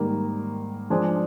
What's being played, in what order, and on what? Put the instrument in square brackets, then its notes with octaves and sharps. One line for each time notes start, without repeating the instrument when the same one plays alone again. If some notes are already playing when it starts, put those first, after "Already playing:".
Already playing: [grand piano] G#2 D#3 G3 A#3
F3 G#3 D4 G#4 C5